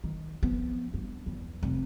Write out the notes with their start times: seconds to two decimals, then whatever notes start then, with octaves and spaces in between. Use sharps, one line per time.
0.04 D#3
0.43 F3 B3
0.94 G2
1.26 E2
1.63 F1